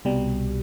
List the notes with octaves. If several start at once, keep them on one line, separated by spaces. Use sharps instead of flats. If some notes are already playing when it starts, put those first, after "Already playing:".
C2 B2 G3